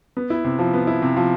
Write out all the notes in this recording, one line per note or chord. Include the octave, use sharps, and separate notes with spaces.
B3
E4
C3
F3
B3
E4
C3
F3